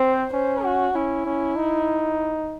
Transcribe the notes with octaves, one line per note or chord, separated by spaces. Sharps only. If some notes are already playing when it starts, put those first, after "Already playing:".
Already playing: C4 C5
C#4 C5
F#4
C#4 E4
C#4
D#4